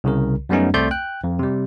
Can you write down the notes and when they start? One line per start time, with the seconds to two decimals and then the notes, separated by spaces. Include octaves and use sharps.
0.04 C2 C#3 A#4
0.49 F#2 G3 A3 B3 C#4 D#4
0.74 C2 A3 C4 D5 C6 G6
0.91 G5 F#6
1.24 F2
1.39 C3 G3